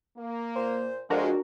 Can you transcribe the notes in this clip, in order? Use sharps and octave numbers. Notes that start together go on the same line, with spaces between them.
A#3
A#2 C5
F2 F3 G#3 D4 F#4 A#4